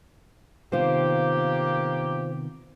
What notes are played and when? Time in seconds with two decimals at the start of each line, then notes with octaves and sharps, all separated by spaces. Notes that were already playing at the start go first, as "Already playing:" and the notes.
0.72 C3 D#3 A#3 B3 F4 G4 C5